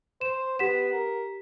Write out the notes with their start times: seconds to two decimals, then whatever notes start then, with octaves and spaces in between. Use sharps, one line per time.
0.21 C5 E7
0.59 B3 G4 B6 E7
0.93 A#4